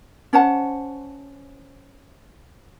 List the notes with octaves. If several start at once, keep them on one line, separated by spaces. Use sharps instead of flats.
C#4 C5 F#5 A5